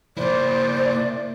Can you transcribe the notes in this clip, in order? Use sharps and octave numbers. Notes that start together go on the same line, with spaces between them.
A#3 E4 C5 D5